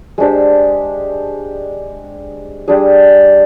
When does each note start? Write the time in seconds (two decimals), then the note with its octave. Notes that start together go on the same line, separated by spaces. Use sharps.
0.18 G#3 D4 G4 C5
2.68 G3 D4 G#4